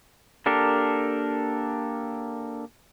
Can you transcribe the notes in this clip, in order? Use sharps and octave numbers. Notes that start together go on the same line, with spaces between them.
A#3 D4 G4 A4 A#4